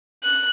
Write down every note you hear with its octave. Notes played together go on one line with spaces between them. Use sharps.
F#6